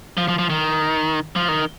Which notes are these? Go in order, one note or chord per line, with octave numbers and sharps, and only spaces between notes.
F3
F3
F3
D#3
F3
D#3